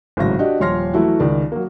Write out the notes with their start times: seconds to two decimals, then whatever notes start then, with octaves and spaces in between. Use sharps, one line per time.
0.17 G#1 A2 C#3 F#3 A#6
0.38 D4 F#4 G4 D5 D#5
0.60 D#1 F3 C#5 C6 F6 A#6
0.93 E3 F#3 A3 E4 F#4
1.20 C#2 D#3 D5
1.52 F#3 A#3